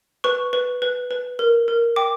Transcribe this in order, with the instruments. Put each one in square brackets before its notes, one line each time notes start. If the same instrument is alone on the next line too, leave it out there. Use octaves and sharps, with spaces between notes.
[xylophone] B4 C#6
B4
B4
B4
A#4
A#4
G5 D6